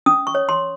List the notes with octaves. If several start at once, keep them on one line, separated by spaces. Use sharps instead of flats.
C#4 D#6
C#6
C#5
C6